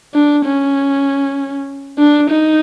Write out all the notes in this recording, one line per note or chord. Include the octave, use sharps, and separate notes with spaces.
D4
C#4
D4
D#4